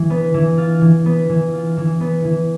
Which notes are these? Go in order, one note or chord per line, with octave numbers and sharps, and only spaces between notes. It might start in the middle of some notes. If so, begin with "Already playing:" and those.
Already playing: E3
B3
E3
F4
E3
B3
E3
F4
E3
B3
E3